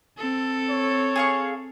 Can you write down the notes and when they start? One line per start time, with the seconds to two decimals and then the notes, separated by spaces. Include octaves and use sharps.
0.18 C4 A4
0.70 C#5
1.16 G#4 F5 C#6